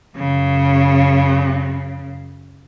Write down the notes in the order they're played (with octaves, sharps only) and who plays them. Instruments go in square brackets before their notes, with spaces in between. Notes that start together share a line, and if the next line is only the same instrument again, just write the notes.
[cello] F#2 C#3